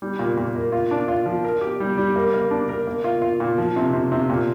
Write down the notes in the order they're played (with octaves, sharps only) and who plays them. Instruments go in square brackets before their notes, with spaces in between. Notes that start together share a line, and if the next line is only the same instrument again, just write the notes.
[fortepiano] G3
A#2
A#2
A#3
F4
D4
F4
F3
A#4
G4
G3
G3
A#3
A#3
D4
A#4
A#3
F4
F4
A#2
F3
C3
C3
C3
A#2